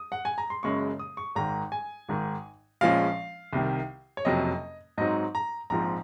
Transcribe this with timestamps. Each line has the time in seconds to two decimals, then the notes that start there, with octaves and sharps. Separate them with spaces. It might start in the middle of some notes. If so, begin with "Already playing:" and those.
Already playing: D#6
0.12 F#5
0.25 G#5
0.38 A#5
0.50 C6
0.63 F#1 F#2 C#3 G#3 C#6
0.99 D#6
1.17 C#6
1.35 G#1 G#2 D#3 A#5
1.72 G#5
2.08 G#1 G#2 D#3
2.81 A#1 A#2 F3 G#3 C#4 F5
3.53 C2 C3 D#3
4.17 C#5
4.25 F#1 F2 C3 F#3 D#5
4.98 G#2 F#3 C4 D#4 D#5
5.35 A#5
5.70 A#1 G#2 F3 C4 A#5